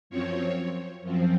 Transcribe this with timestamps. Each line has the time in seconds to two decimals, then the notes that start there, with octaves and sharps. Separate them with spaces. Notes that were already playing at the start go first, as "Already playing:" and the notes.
0.10 F#2 F3 C4 C#5
1.02 F#2 F3 C4